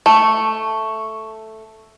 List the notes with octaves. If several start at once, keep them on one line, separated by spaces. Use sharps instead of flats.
A3 C#6